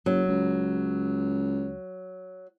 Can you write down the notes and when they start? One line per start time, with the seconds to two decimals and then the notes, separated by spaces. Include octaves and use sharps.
0.06 F#1 F#3
0.28 C#2